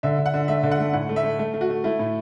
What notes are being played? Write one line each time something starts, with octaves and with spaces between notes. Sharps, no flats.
D3 E5
D3
F#5
D3
A3 E5
D3
F#5
A3
A2 F#5
A3
E5
A3
A3
A3
F#4
A3
A3 E4
A2